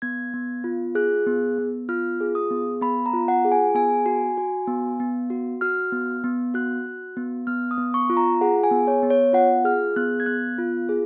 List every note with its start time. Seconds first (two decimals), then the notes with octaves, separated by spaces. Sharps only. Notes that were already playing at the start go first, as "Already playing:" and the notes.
0.02 B3 G#6
0.34 B3
0.64 F4
0.95 G#4 F#6
1.26 B3
1.58 B3
1.89 F4 F6
2.20 G#4
2.35 D#6
2.51 B3
2.81 B3 B5
3.06 A#5
3.13 F4
3.28 F#5
3.45 G#4
3.52 G#5
3.74 B3 G#5
4.06 F#4
4.38 F#4
4.68 B3
5.00 B3
5.30 F#4
5.61 F#4 F6
5.92 B3
6.24 B3
6.54 F#4 F#6
6.86 F#4
7.17 B3
7.47 B3 F6
7.71 D#6
7.78 B3
7.94 C#6
8.10 F4
8.17 A#5
8.41 G#4 F#5
8.63 G#5
8.71 B3
8.88 C#5
9.03 B3
9.10 C#5
9.33 F4 F#5
9.64 G#4 F6
9.96 B3 F#6
10.20 G#6
10.26 B3 F#6
10.58 F4
10.89 G#4